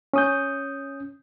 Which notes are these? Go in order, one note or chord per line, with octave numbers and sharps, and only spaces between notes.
C#4 D#6 G6